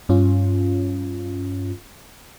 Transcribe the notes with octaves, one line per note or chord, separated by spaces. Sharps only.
G2 C#4 F4